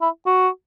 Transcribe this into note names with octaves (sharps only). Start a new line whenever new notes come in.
E4
F#4